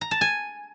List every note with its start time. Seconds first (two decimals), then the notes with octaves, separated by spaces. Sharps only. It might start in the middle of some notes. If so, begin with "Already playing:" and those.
0.01 A#5
0.11 A5
0.21 G#5